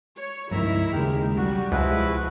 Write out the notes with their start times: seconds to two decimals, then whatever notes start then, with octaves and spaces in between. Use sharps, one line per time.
0.18 C#5
0.51 C#2 G2 D#3 F3 E4 E5 A#5
0.92 D#2 C#3 G#3 G4 A#4
1.37 B1 G3 F#4
1.72 C#2 F3 E4 F#4 G#4 B4